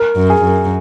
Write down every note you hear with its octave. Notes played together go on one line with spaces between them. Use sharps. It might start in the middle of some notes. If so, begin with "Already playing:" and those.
Already playing: A#4
F#2
G#4
F#2